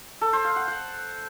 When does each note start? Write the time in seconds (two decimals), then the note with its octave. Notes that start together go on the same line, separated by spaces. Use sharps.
0.21 A4
0.33 C5
0.45 F5
0.56 F#5
0.68 F#5